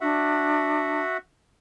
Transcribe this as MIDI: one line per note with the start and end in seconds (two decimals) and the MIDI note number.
0.01 1.02 62
0.01 1.17 66
0.01 1.17 76
0.01 1.17 78